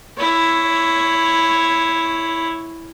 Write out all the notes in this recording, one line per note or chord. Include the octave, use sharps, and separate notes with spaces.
E4 C#5